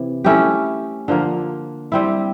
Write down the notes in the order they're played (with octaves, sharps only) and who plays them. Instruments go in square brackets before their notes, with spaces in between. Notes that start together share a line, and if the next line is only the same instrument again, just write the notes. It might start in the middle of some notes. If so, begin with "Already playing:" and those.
Already playing: [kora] C3 E3
A3 C#4 E4 G4
D3 F3 A#3
G3 C4 E4